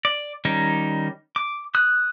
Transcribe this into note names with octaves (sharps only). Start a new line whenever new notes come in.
D5
D#3 G3 C#4 D#4
D6
D#6 F#6